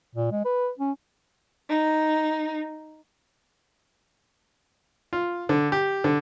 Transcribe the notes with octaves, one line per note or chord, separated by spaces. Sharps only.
A#2
G#3
B4
C#4
D#4
F4
D3
G4
D3